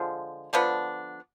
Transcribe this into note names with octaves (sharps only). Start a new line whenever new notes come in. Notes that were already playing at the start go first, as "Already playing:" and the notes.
Already playing: D3 F3 G#3
D3 F3 B3 D4